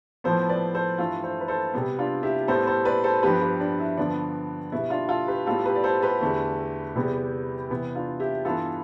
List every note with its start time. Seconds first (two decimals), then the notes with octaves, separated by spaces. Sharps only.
0.24 A2 F3 B3 A4 C5
0.49 B4 D5
0.74 A4 C5
0.98 G2 E3 A3 F4 A4
1.23 A4 C5
1.41 B4
1.48 A4 C5
1.74 C3 G3 B3
1.99 D4 F4
2.23 E4 G4
2.48 A2 G3 B3 A4 C5
2.67 A4 C5
2.85 B4 D5
3.04 A4 C5
3.23 G2 F3 B3 G4 B4
3.41 G4 B4
3.60 D4
3.79 E4
3.97 G2 D3 F3 B3 D4
4.72 B2 G3 B3 E4
4.90 D4 F4
5.09 F4 A4
5.28 G4 B4
5.46 A2 G3 B3 F4 A4
5.66 G4 B4
5.76 D5
5.84 A4 C5
6.02 G4 B4
6.21 E2 D3 A3
6.96 E2 C3 G3 B3
7.70 C3 E3 B3
7.95 D4 F4
8.20 E4 G4
8.45 G2 E3 B3 F4 A4